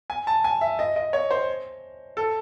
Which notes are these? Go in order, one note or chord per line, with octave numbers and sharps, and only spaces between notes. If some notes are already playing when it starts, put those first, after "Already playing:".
G#5
A5
G#5
E5
D#5
D#5
C#5
C5
A4